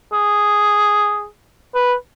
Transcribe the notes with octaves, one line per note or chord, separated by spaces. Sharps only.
G#4
B4